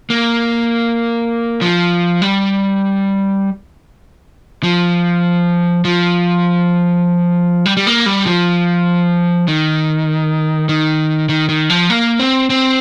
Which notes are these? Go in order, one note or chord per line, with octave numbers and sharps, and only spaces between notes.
A#3
F3
G3
F3
F3
G3
G3
A#3
G3
F3
D#3
D#3
D#3
D#3
F3
A#3
C4
C4